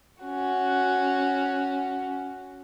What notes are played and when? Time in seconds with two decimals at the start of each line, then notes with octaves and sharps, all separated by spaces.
0.22 C#4 F#4